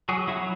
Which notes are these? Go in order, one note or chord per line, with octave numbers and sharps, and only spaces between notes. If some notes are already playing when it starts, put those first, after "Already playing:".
F#3 F#4 G#4
F#3 E4 F#4